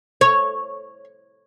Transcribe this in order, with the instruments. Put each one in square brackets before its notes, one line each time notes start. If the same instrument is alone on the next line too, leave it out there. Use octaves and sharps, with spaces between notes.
[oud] C#5